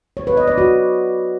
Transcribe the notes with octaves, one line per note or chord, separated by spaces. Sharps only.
C#5
B4
D#5
D5
F#4